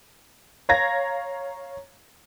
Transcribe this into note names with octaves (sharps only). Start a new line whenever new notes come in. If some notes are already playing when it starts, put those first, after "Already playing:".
C#5 F5 A#5 G#6 A#6